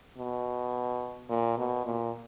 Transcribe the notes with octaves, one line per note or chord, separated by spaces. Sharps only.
B2
A#2
B2
A#2